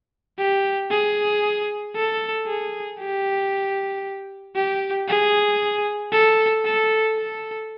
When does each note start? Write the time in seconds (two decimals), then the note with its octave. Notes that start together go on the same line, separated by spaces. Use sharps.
0.38 G4
0.90 G#4
1.95 A4
2.47 G#4
2.99 G4
4.55 G4
5.08 G#4
6.12 A4
6.65 A4
7.17 A4